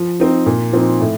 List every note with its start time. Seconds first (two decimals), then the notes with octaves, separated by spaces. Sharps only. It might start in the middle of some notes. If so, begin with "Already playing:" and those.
Already playing: F3
0.20 C4 D#4
0.46 A#2
0.73 F3 C4 D#4
1.00 A2